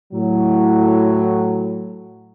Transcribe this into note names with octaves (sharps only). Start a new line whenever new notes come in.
A2 F#3